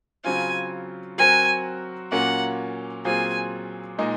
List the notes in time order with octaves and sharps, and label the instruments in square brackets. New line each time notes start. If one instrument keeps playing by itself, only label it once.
[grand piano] C#3 F#3 C4 F4 [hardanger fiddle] G#5
[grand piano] F#3 C4 F#4 A#4 [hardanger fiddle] G#5
[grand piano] A#2 F#3 A#3 C#4 F4 [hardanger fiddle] F#5
[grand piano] A#2 F#3 C4 F4 G#4 [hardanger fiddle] G#5
[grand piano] A#2 G#3 D#4